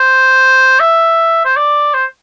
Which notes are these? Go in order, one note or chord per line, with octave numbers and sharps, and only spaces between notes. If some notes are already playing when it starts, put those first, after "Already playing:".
Already playing: C5
E5
C5
D5
C5